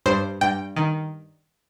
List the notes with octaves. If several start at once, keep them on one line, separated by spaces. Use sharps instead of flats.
G2 C5
G2 G5
D#3